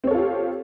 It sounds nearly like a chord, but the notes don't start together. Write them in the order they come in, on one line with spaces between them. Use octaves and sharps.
C4 C#5 A4 F4 G4